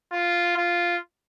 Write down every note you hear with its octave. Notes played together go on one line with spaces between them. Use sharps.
F4
F4